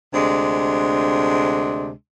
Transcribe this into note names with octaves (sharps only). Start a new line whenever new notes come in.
D2 C3 G#3 D4